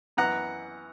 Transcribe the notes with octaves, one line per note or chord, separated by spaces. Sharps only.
F#2 E3 B3 F#5 A#5